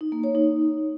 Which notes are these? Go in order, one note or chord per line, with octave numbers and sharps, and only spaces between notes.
D#4
A#3
C#5
D#4